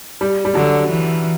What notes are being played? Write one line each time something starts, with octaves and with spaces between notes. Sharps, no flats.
G3
G3
D3 F#3
E3